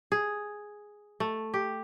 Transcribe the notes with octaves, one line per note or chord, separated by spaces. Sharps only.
G#4
A3
G4